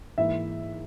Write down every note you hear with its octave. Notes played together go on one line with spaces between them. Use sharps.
G#2 E3 A#3 E4 E5